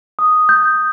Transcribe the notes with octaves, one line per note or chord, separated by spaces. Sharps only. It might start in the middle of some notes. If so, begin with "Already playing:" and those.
D#6
G6